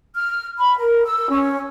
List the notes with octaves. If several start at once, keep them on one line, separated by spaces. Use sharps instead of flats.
F6
B5
A#4
E6
C#4